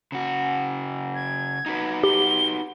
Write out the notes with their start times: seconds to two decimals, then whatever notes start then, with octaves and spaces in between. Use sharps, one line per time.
0.12 C#3 F#4
1.15 G#6
1.66 D#4 F#4 B4
2.04 G4 G7